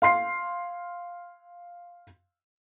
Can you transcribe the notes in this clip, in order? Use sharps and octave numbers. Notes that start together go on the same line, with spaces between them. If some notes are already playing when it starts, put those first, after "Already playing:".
F5 C6 C7